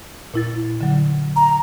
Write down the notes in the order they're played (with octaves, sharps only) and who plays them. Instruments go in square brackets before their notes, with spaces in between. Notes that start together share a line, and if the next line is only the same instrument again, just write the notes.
[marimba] A#2 E4 A6
D3 F#3
[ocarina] A#5